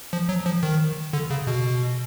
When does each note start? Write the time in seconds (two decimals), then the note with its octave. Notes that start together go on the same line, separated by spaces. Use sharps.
0.13 F3
0.29 F#3
0.46 F3
0.63 D#3
1.13 D3
1.30 C#3
1.47 B2